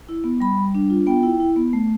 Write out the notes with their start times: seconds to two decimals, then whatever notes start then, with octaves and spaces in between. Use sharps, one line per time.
0.09 E4
0.24 B3
0.40 G3 B5
0.58 G3
0.75 D4
0.90 F4
1.06 B3 G5
1.23 E4
1.40 E4
1.56 B3
1.73 A3